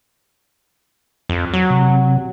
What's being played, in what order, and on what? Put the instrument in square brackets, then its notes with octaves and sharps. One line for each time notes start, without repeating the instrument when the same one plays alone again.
[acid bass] F2
F#3
[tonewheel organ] C3